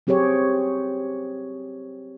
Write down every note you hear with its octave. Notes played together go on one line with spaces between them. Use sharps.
F#3 C4 G4 G#4 C#5